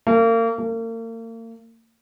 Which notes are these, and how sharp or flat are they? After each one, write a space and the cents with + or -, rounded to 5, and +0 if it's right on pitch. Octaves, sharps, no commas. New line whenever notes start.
A#3 -35
A#3 -40